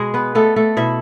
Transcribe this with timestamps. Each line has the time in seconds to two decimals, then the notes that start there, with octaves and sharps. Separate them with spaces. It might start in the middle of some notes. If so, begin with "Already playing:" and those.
Already playing: B2 G#3 G#4
0.14 B3 B4
0.35 A3 B3 A4
0.56 A3 A4
0.77 B2 E4 E5